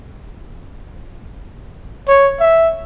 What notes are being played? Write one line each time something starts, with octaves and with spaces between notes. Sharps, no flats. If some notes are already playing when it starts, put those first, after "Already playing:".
C#5
E5